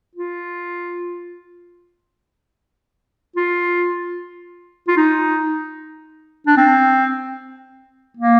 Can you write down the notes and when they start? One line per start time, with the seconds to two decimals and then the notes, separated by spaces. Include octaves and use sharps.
0.15 F4
3.36 F4
4.88 F4
4.97 D#4
6.47 D4
6.57 C4
8.17 A#3